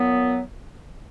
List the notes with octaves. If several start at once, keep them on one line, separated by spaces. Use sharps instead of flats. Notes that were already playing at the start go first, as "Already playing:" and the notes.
Already playing: A#2 F#3 B3